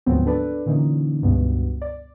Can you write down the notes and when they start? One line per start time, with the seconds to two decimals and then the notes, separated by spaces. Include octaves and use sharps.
0.06 D2 G#2 F3 F#3 B3 C4
0.26 D4 A4 B4 D5
0.66 A#2 D3 E3 C#4 D#4
1.22 C#2 G2 B2 B3
1.82 D5